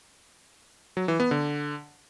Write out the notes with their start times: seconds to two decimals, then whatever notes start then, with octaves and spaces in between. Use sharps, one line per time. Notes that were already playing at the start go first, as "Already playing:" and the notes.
0.97 F#3
1.08 E3
1.20 B3
1.31 D3